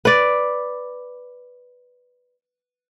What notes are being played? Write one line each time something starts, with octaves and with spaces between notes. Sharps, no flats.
B4 D5